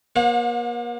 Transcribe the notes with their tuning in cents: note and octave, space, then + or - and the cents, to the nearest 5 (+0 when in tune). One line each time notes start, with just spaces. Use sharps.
A#3 +40 C5 +45 F#5 -35